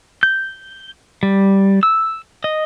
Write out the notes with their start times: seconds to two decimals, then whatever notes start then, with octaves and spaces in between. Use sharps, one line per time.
0.23 G6
1.23 G3
1.83 E6
2.44 D#5